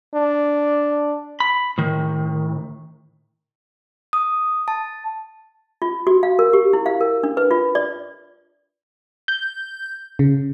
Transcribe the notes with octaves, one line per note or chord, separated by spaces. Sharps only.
D4
B5
A2 D#3
D#6
A5
F4
F#4
F5
A#4
G4
E4
F5
A#4
D4
B4
F4
D5
G6
C#3